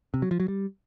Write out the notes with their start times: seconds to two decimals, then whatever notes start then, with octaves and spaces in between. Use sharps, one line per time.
0.14 C3
0.22 F#3
0.31 F3
0.40 F#3
0.48 G3